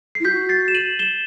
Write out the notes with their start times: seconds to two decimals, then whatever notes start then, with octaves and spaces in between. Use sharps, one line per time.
0.15 C7
0.20 E4
0.25 F#4 G6 B6
0.49 A6 C7
0.68 E7
0.74 D#7 F#7
0.99 E7 G7